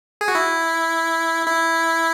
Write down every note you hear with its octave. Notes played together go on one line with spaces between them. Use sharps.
G#4
F#4
E4
E4